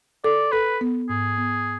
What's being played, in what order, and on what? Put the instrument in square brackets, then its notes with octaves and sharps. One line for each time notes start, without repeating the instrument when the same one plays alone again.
[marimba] A4 [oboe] D5
[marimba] A4 [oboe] B4
[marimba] B3
[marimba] G#2 [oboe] G#4
[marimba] B3